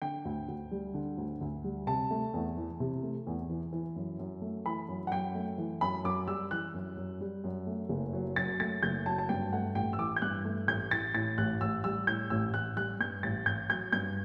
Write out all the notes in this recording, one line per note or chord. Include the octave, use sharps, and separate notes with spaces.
D3 G5
D2
D2
G3
D3
D2
D2
G3
C3 A5
A3
E2
E3
C3
A3
E2
E3
E3
F#2
F#2
A3
E3 B5
F#2
F#5
F#2 G5
A3
E3
F#2 B5
F#2 D6
G3 E6
E3 F#6
F#2
F#2
G3
F#2
A3
F#1
F#3
F#2 A6
A3 A6
F#1 G6
F#3 A5
A5
G2 G5
A3 F#5
A1 G5
E6
E3 D6
G6
G2 F#6
A3
A1 G6
E3 A6
A2 A6
A1 F#6
A1 E6
G3 E6
A2 G6
A1 E6
A1 F#6
G3 F#6
G2 G6
A1 A6
A1 G6
F#3 G6
G2 G6